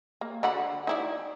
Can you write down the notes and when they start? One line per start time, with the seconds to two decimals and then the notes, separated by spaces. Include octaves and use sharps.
0.21 A#3
0.43 D3 F#4 B5
0.87 D#4 E4 D5